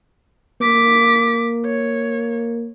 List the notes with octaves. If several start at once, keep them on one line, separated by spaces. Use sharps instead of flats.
A#3 D6 B6
C#5